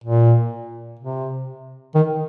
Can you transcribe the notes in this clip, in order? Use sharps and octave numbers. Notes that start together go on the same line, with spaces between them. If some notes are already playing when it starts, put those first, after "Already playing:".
A#2
C3
D#3